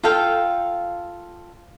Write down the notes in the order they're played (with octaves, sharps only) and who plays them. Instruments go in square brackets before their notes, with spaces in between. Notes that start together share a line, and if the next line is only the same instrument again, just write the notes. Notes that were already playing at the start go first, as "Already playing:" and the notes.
[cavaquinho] F4 A4 F5 G5